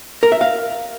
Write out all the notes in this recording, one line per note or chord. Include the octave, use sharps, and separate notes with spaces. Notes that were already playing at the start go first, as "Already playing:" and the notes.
A#4
E5
F5